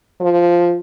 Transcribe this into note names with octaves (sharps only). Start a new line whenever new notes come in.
F3